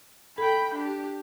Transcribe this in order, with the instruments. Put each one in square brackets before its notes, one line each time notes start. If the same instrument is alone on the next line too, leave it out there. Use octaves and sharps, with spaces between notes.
[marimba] A4 [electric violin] G5 B5
[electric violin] D4 G4